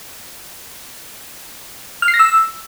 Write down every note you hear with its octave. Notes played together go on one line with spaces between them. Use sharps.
F6
C7
A#6
E6